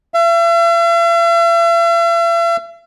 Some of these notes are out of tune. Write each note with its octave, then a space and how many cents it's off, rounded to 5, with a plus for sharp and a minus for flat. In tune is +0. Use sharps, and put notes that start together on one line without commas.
E5 +45